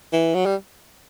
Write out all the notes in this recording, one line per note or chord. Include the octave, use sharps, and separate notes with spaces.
E3
F#3
G3